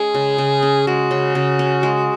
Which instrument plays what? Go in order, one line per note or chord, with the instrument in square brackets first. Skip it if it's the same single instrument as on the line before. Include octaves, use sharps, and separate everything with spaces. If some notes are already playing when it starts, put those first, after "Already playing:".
Already playing: [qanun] G#3 C#4 [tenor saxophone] G#4
[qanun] C#3
C#3
C#4
[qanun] G#3 [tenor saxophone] F#4
[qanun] C#3
C#3
C#4
G#3